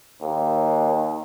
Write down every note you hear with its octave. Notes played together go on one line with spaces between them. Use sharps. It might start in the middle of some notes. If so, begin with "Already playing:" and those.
D#2